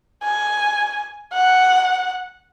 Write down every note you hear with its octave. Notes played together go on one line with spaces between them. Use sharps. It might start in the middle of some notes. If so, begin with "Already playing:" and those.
G#5
F#5